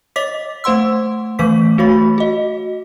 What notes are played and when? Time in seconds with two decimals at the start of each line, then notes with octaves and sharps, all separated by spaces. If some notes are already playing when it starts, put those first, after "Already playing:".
0.16 C#5 D#5 D6 B6
0.64 A3 C5 F#5 C6 E6
1.39 E3 A3 B4 D6 B6
1.78 A3 F#4 C#5 B5
2.18 F#4 D#5